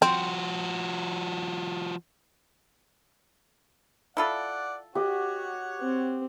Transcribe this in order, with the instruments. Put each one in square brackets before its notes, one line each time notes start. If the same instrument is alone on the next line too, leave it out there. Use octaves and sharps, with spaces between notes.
[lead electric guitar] F3 F#4 [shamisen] C4
[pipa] E4 F4 A4 [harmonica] D5 F#5
[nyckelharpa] F#4 [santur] G4 D#5 [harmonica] C#5 F#5
[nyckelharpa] C4